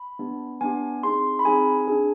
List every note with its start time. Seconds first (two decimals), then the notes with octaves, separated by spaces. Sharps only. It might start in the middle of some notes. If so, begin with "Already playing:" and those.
Already playing: B5
0.19 B3 D4 G4
0.61 B3 D4 G4 G#5
1.03 C4 D#4 G#4 C6
1.39 B5
1.45 C4 D#4 G#4 G#5
1.88 D4 G#4